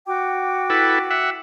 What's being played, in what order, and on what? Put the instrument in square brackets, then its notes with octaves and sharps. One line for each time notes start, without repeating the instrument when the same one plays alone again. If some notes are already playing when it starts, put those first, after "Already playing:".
[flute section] F#4 G5 D6
[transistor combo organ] E4 A4 B4
E5 F#5